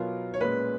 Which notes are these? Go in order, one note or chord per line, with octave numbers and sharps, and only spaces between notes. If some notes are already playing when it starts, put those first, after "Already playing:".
Already playing: B2 F#3 B3 F4 A#4
C#5
A#2 G#3 C#4 B4